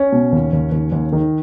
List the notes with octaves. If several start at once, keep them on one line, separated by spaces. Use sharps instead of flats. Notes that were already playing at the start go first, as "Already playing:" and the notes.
Already playing: C#4
B2
D#2
D#2
D#2
D#2
D#3